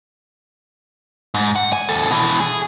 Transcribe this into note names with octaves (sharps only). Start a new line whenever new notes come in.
G#2
F#5
G#5
D#2 A4
B2 E3
G#4